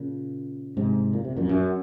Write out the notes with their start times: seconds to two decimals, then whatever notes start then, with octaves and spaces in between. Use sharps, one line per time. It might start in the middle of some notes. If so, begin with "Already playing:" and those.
Already playing: A#2 C#3
0.77 G#2 C3
1.13 A#2
1.25 C3
1.37 F#2 A#2
1.49 F#2